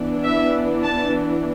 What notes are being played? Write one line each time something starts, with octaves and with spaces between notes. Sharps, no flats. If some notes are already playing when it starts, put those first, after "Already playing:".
Already playing: E3 B3 D4
E5
A5